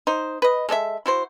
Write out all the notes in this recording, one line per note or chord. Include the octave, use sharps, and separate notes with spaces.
D#4 C5
B4 D#5
G#3 A4 D5 E5
E4 F#4 C5